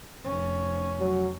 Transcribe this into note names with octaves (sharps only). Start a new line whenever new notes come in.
F1 C#4
F#3